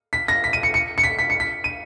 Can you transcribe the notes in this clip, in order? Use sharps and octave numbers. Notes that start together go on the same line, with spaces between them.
B6
A#6
B6
D#7
C#7
C#7
C#7
B6
B6
C#7
B6
D#7